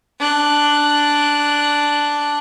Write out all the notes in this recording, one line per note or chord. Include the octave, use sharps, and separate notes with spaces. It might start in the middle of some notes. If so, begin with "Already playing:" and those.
D4 F#6